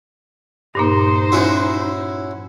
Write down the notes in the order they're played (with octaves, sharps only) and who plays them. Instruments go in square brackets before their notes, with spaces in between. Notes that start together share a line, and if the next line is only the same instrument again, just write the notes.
[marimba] G2 A#2 A#3 [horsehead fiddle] D#4 C5
[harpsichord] C#4 E4 F#4